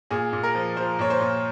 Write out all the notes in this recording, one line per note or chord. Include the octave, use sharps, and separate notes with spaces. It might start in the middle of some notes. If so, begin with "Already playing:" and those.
A#2 G#4
A#2
A#4
F3
F3 C5
A#2 C#5
C5
A#2